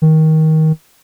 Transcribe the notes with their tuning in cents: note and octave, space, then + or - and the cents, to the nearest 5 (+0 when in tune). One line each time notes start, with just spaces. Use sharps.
D#3 +20